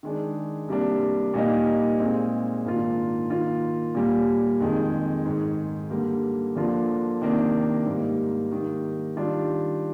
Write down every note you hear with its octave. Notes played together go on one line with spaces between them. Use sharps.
D#3 G#3 D4
C3 G3 A#3 D4
A#2 G3 A#3 D#4
A#2 G#3 C4
G#2 D#3 A#3 D4 F4
D#3 A#3 F4
A#2 G3 A#3
F2 D#3 G#3
G#2 D#3 G#3
D3 G3 A#3
D3 F3 A#3 D4 F4
C3 D#3 A#3 D4
G#2 G3 A#3
D#3 G3 A#3
D#3 G3 D4 F4